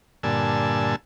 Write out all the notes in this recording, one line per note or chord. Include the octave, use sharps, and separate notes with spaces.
G2 A#2 D3 G#5 A5 E6